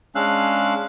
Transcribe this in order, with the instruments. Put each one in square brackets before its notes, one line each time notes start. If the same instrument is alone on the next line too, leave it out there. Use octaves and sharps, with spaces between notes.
[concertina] G#3 C#4 D4 F5 E6 F#6